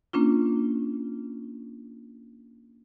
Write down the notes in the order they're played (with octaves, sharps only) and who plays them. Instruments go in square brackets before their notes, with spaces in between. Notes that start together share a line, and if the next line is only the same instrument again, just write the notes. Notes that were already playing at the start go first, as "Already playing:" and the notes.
[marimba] A#3 C#4 D4 F4